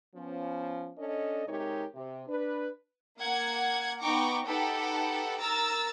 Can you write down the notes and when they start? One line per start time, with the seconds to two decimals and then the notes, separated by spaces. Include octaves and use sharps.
0.15 F3 B3 C#4
0.98 C#4 D4 A4 D#5
1.46 C3 G#3 D#4 G4 A#4 C#5
1.95 C3
2.28 D4 B4
3.18 A#3 F#5 G#6
4.00 B3 D#4 G5 A#5 C#6 D6
4.45 D#4 G4 A4 B4 F#5 A5
5.39 A#4 A#5 E6 A6